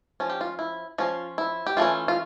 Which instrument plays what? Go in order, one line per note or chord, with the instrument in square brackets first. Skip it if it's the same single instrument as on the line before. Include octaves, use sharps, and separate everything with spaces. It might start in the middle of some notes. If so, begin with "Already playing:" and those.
[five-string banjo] F3 C#4 F4
G4
F4
E4
F3 C#4 F4
E4
G4
E3 A3 C#4 F4
F4